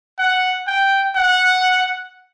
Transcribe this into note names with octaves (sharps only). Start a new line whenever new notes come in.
F#5
G5
F#5